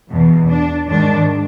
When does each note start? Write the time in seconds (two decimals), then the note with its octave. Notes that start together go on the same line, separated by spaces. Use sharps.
0.10 E2 B2
0.49 D4
0.88 G#2 D#3 D4